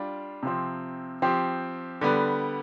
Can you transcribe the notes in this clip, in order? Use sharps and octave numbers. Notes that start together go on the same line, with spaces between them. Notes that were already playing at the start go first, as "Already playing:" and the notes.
Already playing: G3 D4 F4
C3 F3 C4
F3 C4 G4
D3 G3 B3